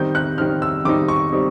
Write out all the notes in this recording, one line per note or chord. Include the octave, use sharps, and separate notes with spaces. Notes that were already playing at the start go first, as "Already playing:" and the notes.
Already playing: D#3 G3 C4 D#4 G6
F#6
D#3 G3 C4 D#4 F6
E6
D#3 G3 C4 D#4 D6
C#6
G3 C4 D#4